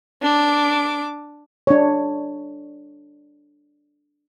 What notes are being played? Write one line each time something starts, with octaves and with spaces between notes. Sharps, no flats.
D4 D6
D4 C#5